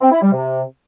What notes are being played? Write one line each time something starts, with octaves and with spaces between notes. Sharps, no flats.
C4
E4
G3
C3